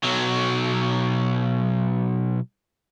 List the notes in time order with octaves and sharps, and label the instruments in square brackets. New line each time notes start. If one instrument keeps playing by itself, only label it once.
[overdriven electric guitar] B1 F#3